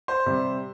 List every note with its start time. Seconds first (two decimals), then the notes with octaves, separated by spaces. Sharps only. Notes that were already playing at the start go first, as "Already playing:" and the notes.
0.08 C5
0.26 C3 G3 C4